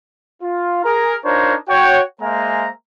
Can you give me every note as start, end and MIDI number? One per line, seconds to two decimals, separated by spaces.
0.42 0.83 65
0.84 1.15 68
0.84 1.15 70
0.84 1.15 82
1.24 1.54 62
1.24 1.54 63
1.24 1.54 65
1.24 1.54 70
1.24 1.54 72
1.24 1.54 73
1.68 2.01 66
1.68 2.01 73
1.68 2.01 79
2.21 2.68 56
2.21 2.68 58
2.21 2.68 72
2.21 2.68 76
2.21 2.68 80
2.21 2.68 82